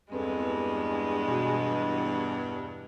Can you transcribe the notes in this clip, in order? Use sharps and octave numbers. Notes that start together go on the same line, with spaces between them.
E2 G2 G#3 C4 A4 B4
B2 F#4